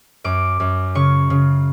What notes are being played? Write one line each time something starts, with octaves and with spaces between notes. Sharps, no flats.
F#2 D6
F#2
C#3 C#6
C#3